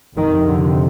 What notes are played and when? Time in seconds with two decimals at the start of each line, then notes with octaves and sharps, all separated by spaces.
0.16 F2 C3 D#3
0.48 D3